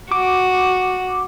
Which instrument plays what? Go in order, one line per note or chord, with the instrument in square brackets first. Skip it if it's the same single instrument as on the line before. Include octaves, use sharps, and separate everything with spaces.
[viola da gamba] F#4 [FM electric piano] D6